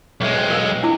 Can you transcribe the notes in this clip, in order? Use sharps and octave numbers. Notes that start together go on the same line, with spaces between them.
B1 G#3 C#5 E5
B4 C5 G5
A#4 F5 E6
D4 E4 D6